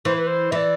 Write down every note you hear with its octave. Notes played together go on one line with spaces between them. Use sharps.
E3 C5
B4
C5
E3 D5 E5